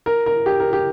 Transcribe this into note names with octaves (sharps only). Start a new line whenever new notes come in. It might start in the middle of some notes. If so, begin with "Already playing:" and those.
A#4
A#4
G4
A#4
G4